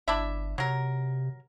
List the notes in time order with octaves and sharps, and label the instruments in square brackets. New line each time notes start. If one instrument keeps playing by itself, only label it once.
[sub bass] G1 [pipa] D4 E4 E5
[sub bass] C3 [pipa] F#3 A#4